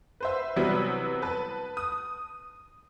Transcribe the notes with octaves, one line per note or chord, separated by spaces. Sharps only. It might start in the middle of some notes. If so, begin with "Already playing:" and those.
B4 C5 E5
C3 E3 F#3 G3 B3
B4 A5
D#6